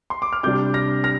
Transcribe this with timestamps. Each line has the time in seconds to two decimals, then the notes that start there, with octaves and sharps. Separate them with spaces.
0.10 C6
0.22 D6
0.33 F6
0.43 C3 G3 D4 D6 G6
0.74 F6 A#6
1.04 F6 A#6